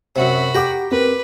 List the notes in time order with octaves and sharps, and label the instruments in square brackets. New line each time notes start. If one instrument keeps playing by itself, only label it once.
[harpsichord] F#2 C3 [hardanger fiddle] F#4 B5
[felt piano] G4 F#5 D6 [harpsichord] G5 A#5
[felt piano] C4 A#4 [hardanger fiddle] B4